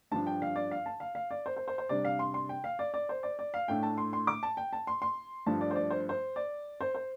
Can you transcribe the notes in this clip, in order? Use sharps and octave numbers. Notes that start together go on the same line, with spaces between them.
G2 F3 D4 A5
G5
F5
D5
F5
A5
F5
F5
D5
C5
C5
C5
C5
C3 G3 D4 D5
F5
C6
C6
G5
F5
D5
D5
C5
D5
D5
F5
A2 A3 D4 G5
A5
C6
C6
D6
A5
G5
A5
C6
C6
G2 F3 A3 D4 A5
D5
C5
D5
C5
C5
D5
C5
C5